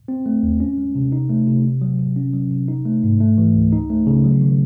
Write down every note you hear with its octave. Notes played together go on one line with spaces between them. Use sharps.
C4
A3
D#2
C#4
G#3
C3
D#4
A3
C3
C3
F#3
C3
C#4
F#3
C3
D#4
A3
G#2
A3
E3
C#2
D#4
A3
C#3
F#3
D#3